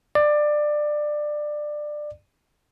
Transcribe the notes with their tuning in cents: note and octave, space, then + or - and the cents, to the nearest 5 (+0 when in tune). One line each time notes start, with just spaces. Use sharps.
D5 +20